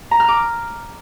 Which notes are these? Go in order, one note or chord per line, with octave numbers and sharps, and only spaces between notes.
A#5
F6
D6